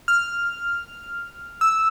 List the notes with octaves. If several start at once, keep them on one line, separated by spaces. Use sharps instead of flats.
F6
E6